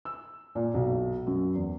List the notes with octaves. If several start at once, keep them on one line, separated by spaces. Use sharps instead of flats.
E6
A#2
B1
F#2
E2